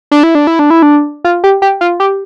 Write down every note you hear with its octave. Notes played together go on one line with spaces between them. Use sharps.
D4
E4
D4
E4
D4
E4
D4
F4
G4
G4
F4
G4